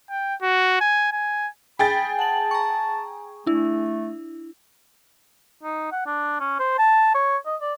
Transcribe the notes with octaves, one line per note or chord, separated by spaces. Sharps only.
G5
F#4
G#5
G#5
G#4 G5 B5 A6
F#5 A5 F#7
A#5 C#6
A3 D4 E4
D#4
F#5
D4
C#4
C5
A5
C#5
D#5
D5